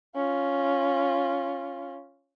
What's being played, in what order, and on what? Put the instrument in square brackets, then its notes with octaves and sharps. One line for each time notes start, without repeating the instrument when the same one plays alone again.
[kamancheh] C#4 F4